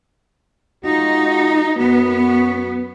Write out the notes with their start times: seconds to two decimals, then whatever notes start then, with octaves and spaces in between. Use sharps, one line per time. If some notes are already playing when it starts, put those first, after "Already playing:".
0.84 G#3 D#4 F4 F#4
1.78 F#2 B3 F#4